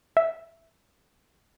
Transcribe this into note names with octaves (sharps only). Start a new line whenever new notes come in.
E5